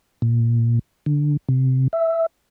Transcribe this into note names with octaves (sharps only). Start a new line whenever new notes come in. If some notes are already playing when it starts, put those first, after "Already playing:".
A#2
D3
C3
E5